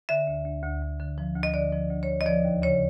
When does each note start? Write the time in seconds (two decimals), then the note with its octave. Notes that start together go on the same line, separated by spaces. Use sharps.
0.09 D3 E5
0.27 D2
0.45 D2
0.63 D2
0.82 D2
0.99 D3
1.18 F3
1.36 D2
1.43 D#5
1.54 D3 D5
1.72 F3
1.90 D2
2.03 C#5
2.08 D2
2.21 D#5
2.26 F3 D5
2.45 D#2
2.62 C#3 C#5